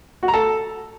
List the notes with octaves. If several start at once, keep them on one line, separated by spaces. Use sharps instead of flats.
F#4
A#5
A4